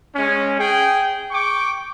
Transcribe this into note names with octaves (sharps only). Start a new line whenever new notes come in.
G#3 C#4
G#4 G5
G5 C#6 D6